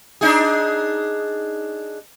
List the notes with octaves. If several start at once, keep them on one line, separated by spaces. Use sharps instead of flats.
D4 D#4 G#4